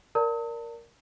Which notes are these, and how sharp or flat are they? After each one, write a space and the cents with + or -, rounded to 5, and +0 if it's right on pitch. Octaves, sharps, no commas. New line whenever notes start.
A#4 +0 D5 -15 A5 +40